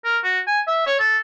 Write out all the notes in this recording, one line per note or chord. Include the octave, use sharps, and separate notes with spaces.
A#4
F#4
G#5
E5
C#5
A4